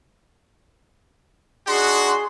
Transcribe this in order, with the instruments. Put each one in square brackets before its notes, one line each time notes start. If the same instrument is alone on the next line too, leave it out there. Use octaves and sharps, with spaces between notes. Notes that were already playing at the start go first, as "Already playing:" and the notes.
[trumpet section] D4 D#4 F#4 [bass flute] G#4 [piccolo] C6